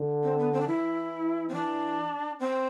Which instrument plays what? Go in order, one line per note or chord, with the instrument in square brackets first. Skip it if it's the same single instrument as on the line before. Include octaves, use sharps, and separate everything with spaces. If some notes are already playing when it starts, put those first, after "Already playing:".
Already playing: [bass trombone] D3
[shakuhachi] C4
B3
C4
D4
[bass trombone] E3 [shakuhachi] E4
[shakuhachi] C4
[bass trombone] E3 [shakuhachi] D4
[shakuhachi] C4